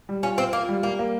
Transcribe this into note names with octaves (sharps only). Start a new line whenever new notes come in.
G3
C#4 F4
C4 F4
A#3 F4
G3
G3 A#3
A#3